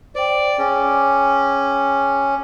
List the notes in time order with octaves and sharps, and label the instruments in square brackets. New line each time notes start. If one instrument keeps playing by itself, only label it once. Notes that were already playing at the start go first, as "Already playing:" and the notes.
[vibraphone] C5 G5 [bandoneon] D5
[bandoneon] C#4 [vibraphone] G#4 G5 D6